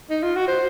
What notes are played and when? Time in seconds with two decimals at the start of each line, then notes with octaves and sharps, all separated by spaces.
0.10 D#4
0.23 F4
0.36 F#4
0.48 C5